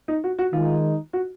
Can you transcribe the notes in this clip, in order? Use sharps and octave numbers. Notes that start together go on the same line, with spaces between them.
D#4
F#4
F#4
D#3 G#3 D#4 F4
F#4